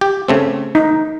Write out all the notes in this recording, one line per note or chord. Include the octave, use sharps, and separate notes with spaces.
G4
C#3 A3 C4
D#4